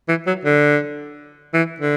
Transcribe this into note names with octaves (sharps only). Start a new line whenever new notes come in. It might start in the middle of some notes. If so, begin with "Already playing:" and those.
E3
F#3
D3
E3
D3